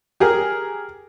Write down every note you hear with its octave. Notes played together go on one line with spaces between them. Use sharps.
G4 G#4 A#4